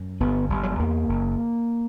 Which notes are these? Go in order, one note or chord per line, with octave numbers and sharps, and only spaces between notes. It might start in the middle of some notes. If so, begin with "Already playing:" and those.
Already playing: F#2
G1 B3
G1 G3
F#3
G3
E2 A#3
F#1